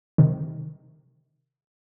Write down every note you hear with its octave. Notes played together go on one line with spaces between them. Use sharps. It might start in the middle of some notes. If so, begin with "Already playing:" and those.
C3 D#3